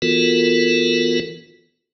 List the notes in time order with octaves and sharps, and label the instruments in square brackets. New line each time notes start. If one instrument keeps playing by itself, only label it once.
[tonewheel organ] E3 B3 F4 F#4 A4 A#4